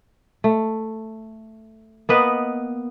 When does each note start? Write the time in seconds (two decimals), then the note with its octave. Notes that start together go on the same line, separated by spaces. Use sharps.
0.44 A3
2.09 A#3 B3 B4 D#5